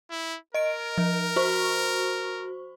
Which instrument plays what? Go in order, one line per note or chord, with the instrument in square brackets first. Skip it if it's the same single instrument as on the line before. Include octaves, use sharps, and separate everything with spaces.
[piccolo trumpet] E4
[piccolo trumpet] A#4 [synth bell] D#5 D7
[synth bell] F3
F#4 C5 C#6